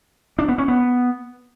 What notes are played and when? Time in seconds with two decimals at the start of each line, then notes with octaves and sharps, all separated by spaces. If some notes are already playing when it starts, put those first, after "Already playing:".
0.39 D4
0.48 B3
0.58 C#4
0.68 B3